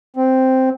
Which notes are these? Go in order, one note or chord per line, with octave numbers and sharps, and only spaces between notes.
C4